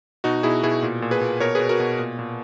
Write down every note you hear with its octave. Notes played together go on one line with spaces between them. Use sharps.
B2 D#4 F#4
B2 E4 G#4
B2 E4 G#4
A#2
A#2
G#4 B4
A#2
B2 A#4 C#5
B2 G#4 B4
F#4 A#4
B2
A#2
A#2